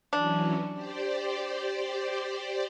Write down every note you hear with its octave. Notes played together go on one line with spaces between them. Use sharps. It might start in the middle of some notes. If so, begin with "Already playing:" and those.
E3 F#3 C#4 D4
G4 C5 D5